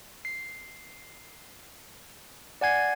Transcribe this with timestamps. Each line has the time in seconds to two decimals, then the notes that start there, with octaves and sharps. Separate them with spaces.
0.25 C7
2.61 D5 F#5 G#5 G#6 C7